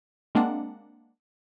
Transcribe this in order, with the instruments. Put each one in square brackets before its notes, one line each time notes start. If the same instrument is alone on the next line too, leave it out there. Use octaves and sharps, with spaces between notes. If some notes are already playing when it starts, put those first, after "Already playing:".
[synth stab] G#3 A#3 C4 D4 F#5